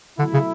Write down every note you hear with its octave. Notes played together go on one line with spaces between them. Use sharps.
B2 D3 F#3 A3 E4
C#3